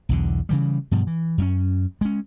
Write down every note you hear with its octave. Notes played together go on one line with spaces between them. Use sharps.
B1 E2 D3
C#3 E3 G3
G2 B2 F3
E3
F#2 A3 C#4
G#3 C#4